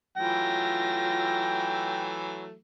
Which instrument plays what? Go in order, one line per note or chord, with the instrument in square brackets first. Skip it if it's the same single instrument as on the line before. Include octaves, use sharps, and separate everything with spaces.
[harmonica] E3 F#3 A3 [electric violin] F4 A#6 [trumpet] G5